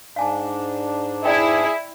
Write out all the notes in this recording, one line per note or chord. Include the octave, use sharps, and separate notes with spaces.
G#2 D4 F5 G#5 A5
E4 G#4 D5 G5